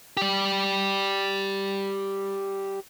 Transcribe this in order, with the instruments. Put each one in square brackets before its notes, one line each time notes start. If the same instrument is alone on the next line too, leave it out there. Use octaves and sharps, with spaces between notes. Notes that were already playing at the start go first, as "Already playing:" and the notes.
[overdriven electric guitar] G4 D5